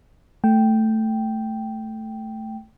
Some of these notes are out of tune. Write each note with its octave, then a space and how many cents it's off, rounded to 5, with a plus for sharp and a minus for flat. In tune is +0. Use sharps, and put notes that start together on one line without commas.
A3 +0 G5 -5